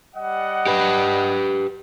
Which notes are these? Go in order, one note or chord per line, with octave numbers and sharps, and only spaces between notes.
G3 D#5 F#5
G4 B4